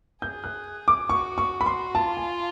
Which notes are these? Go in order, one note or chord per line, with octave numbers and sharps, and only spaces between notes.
G#4 G6
F#6
D6
F#4 C#6
C#6
B5
C6
F4 A5
G#5